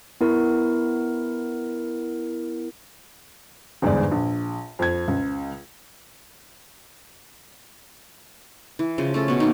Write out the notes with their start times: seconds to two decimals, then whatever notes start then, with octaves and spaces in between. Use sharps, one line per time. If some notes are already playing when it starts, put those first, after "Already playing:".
0.21 B3 E4 A#4
3.82 G1 E2 G#2 G#4 D5
4.11 A#1
4.79 F2 G#6
5.08 C#2
8.79 E3
8.98 C#3 F3
9.14 A3 C#4 A4
9.28 B2 B3
9.40 D#3 A#3